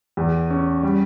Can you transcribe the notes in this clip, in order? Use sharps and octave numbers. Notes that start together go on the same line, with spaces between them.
E2
C#4
G3